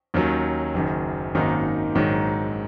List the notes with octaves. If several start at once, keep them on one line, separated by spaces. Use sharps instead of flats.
D#2 D#3 F#3 C#4
F#1 F#2 D#3
G#1 F#2 D#3 A#3 D#4
A#1 G#2 D#3 F#3